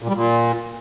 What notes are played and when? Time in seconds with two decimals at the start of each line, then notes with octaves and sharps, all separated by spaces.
0.02 A#2
0.09 G3
0.15 A#2